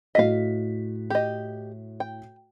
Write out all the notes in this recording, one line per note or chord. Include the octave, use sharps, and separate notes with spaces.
A2 F#4 D#5 F5 B6
G4 D#5
G5